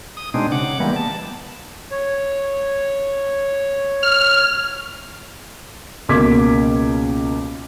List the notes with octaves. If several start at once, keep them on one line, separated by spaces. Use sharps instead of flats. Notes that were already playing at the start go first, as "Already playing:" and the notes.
D#6
B2 G#3 C4 D4 D#4
C#3 F#5 D6
E3 G3 G#3 A#3 B3
A5
C#5
F6
C#2 B2 A#3 D6 G#6 B6